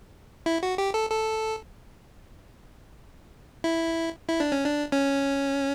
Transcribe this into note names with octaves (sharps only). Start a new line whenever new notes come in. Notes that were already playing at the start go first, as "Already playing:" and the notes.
E4
F#4
G4
A4
A4
E4
E4
D4
C#4
D4
C#4